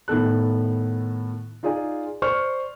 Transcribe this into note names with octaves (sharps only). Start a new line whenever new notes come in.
A2 D#3 B3 A4 F#6
D#4 F4 G#4 D5 G#5
C5 D5 C#6 F6